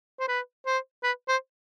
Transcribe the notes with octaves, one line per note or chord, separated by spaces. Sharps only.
C5
B4
C5
B4
C5